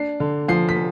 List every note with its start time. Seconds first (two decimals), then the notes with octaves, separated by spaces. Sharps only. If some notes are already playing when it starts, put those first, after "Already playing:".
Already playing: D4 C7
0.20 D3
0.48 F3 C7
0.69 B6